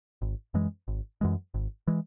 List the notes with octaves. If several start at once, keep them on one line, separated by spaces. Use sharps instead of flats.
G#1
F#2 E3 G#3
G#1
F#2 E3 G#3
G#1
E3 G#3